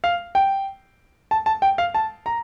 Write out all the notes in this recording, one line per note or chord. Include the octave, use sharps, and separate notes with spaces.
F5
G5
A5
A5
G5
F5
A5
A#5